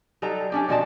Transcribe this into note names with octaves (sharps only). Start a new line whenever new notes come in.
F#3 G3 D#4 A4 A#5
C#4 D4 G4
B2 F3 F#4 D5 D#5 A5